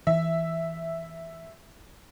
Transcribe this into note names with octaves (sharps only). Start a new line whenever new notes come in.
E3 E5